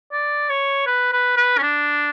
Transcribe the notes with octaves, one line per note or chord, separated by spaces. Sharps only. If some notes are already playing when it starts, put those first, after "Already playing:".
D5
C#5
B4
B4
B4
C#4
D4